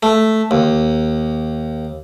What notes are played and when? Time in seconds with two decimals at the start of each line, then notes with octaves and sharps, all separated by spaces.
0.03 A3
0.51 D#2